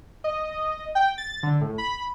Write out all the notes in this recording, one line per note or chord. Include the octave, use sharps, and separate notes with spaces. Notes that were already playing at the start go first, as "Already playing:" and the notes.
D#5
G5
A6
D3
A2
B5